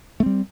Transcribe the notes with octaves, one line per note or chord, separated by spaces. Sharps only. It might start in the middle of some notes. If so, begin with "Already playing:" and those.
G3 A3 C4